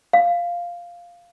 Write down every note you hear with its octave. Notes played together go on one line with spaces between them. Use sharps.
F5